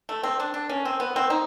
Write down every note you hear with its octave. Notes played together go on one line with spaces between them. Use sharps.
A3
C4
D4
D4
C#4
C4
B3
C4
D#4